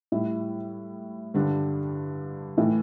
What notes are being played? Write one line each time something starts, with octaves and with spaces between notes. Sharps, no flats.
A2 G3 E4
G2 D3 G3 D4
A2 E3 A3